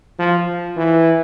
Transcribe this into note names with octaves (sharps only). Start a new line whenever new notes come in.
F3
E3